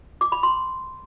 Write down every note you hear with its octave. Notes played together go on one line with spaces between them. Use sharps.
D6
B5
C6